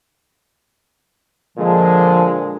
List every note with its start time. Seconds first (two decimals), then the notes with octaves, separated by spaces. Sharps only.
1.58 A#2 D3 F3 G#3